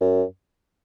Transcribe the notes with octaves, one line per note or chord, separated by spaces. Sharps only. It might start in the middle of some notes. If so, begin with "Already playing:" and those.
F#2